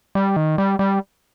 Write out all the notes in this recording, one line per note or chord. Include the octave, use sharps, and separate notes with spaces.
G3
D#3
G3
G3